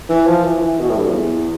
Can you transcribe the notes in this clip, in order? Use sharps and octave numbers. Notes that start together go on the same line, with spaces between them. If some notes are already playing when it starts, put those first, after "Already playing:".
E3
F3
E3
E3
B2
A2
G2
F2
E2